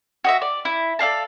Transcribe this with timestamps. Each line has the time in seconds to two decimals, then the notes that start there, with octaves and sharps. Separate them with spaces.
0.24 F#4 D#5 E5
0.42 D5
0.65 E4
0.99 A4 D5 F5 A5